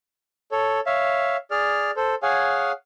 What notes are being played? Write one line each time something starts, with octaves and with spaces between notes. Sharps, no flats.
A4 C#5
C#5 E5 F5
G#4 D5 F6
A4 C5
G#4 C#5 F5 F#5 G#5